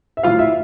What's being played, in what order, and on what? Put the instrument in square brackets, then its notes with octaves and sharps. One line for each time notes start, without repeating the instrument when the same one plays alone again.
[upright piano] E5
A2 F#3 F4 F5
E4 E5